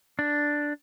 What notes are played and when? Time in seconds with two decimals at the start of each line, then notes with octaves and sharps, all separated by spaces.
0.19 D4